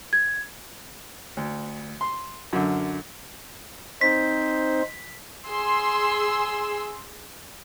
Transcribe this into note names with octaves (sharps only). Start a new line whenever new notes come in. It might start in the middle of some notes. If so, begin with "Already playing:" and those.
G#6
D2
C6
F#2 D3
C4 D#4 C5 B6
G#4 C6 E6